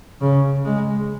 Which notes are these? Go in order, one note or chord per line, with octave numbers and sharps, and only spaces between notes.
C#3
G#3